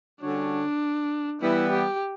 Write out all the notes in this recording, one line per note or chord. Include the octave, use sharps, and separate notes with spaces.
D3 G3 C#4 D4 F#4 C#5
E3 G3 B3 E4
G4